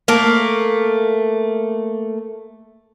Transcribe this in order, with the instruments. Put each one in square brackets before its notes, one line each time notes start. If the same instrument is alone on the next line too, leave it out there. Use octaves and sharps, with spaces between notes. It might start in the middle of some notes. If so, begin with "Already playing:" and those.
[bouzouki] A3 A#3